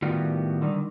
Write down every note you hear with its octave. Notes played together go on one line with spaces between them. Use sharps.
A2 D#3 G3 B3 F4 F#4
D3 D#3 G3